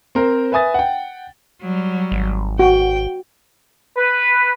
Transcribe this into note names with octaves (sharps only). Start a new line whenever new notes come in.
C4 A#4 C5
B4 E5 G#5 D#6 A6
F#5 G5
F#3 G3
G#1
F#4 G5
B4